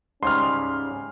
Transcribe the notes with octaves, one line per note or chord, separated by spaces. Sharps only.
G#2 C#3 G3 C#4 C6 F6